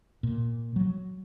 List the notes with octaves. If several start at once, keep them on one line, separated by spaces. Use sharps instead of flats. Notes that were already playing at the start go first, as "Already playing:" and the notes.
A#2
F#3